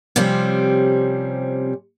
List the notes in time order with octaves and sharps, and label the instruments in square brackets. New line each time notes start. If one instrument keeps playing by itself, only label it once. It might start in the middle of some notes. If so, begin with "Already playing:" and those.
[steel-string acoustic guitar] C3 F3 G3 C4 C#4